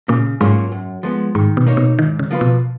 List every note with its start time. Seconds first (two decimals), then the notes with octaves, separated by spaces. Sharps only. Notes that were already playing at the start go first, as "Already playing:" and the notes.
0.08 A#2 C#3
0.41 G#2 F#3 A#3 C#4 F4
0.72 F#2
1.03 F3 G#3 B3
1.35 G#2 D#3
1.57 B2
1.66 A#3 D#4 A#4 C#5
1.77 B2
1.99 G#2 D#3
2.19 C#3
2.31 F3 A#3 F4 B4
2.41 B2